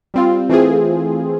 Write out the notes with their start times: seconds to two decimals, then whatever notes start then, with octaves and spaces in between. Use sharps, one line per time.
0.14 G3 C4 F4
0.49 E3 A3 C4 F4 G#4